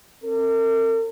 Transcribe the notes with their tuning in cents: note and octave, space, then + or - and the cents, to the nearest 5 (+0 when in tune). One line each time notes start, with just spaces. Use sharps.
C4 +35 A#4 -45